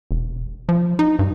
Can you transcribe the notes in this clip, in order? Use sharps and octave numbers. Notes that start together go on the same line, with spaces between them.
E1
F3
D#4
G2